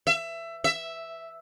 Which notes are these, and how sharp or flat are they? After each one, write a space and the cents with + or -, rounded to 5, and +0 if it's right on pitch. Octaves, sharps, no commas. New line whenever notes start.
E5 +20
E5 +0